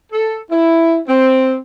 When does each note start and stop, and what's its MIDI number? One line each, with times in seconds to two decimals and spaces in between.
0.12 0.40 69
0.51 0.99 64
1.09 1.56 60